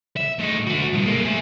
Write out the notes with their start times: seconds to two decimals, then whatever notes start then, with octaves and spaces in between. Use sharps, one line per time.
0.17 E5
0.39 A2 D#4
0.67 A3 F#4
0.94 G2 B2
1.06 G#3 A#3
1.25 G#4 E5